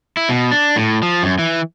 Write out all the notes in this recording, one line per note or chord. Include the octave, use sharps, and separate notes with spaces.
E4
B2
D4
A2
F3
F#2
E3